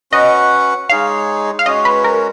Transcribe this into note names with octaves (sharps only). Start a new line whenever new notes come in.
C#4 F#4 B4 D#5 F#5
G#3 D#4 G#4 C#5 F5
F5
G#3 C#4 F#4 C#5 D#5
B4
A#4